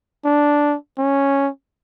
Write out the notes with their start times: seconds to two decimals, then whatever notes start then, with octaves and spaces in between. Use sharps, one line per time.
0.25 D4
0.98 C#4